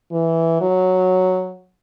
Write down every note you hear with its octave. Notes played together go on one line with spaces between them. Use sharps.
E3
F#3